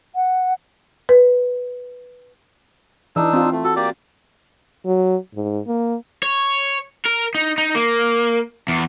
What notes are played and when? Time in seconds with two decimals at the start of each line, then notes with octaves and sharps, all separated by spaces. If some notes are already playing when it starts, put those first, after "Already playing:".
0.15 F#5
1.09 B4
3.16 E3 D4 D#4 E6
3.33 C4 F4
3.52 A3
3.64 F#4 A4
3.76 A#3 G4 D5
4.86 F#3
5.34 G#2
5.67 A#3
6.22 C#5
7.05 A#4
7.35 D#4
7.58 D#4
7.75 A#3
8.68 E2